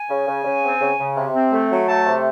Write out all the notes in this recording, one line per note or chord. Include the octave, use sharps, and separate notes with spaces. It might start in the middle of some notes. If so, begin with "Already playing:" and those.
Already playing: G#5
C#3
C#3
C#3
C4
C#3
C#3
C3
C4
A3
F#3
A3 A5
C3